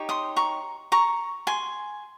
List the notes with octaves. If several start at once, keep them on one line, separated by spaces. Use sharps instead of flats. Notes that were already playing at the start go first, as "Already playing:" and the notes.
Already playing: D#4 G4 C#5
C6 D#6
A#5 C#6
A#5 C#6
G#5 C6